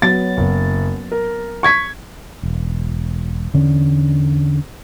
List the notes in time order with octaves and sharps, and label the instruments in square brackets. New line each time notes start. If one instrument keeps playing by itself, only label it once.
[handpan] F#3 B3 [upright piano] A6
[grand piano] F#1
A#4
[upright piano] C#6 G#6 B6
[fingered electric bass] E1
E2 D3 C#4